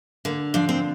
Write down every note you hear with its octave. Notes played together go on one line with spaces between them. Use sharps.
D3 A#3
F3 D4
C4